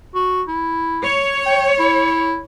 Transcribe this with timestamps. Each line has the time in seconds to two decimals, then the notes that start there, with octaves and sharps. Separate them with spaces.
0.15 F#4
0.48 E4
1.04 C#5
1.46 G5
1.79 E4